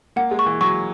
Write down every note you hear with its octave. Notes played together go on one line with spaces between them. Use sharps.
A#3 F#5
G#3
C#6
E3
F#3 C#6